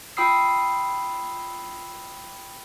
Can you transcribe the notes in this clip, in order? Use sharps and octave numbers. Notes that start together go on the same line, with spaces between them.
F4 G5 B5 D#6 E6 C7